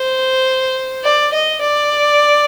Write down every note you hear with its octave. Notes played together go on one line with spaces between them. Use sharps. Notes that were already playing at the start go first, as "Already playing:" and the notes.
Already playing: C5
D5
D#5
D5